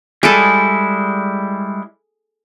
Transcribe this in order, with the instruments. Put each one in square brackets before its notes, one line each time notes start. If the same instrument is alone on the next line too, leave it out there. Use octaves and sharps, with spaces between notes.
[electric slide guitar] G3 G#3 E4 [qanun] G#4 A4